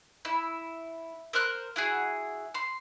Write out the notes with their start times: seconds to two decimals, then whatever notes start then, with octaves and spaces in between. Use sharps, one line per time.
0.25 E4
1.33 A#4 C5 F6 F#6
1.76 E4 F#4 G#4
2.54 C6